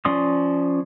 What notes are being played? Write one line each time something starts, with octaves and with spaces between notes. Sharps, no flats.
F3 C#4 D5 C6 D#6